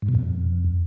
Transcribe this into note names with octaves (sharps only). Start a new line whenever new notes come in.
G#2
B2
F2